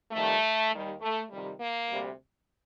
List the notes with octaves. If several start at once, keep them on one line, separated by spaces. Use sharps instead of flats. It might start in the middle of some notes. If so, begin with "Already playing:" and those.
F2 D#3 G3 A3
D#2 D#3 G3
A3
F2 C3 D#3 G3
A#3
D2 C3 G3